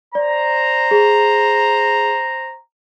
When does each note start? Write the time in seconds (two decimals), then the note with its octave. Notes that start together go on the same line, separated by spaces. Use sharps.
0.15 C5 D5 A#5
0.91 G#4